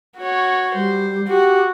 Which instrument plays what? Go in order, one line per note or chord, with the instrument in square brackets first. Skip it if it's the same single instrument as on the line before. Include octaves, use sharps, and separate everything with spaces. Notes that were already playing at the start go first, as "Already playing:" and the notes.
[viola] F#4 C#5
[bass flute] G3 [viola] C5
[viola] F#4 [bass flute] G4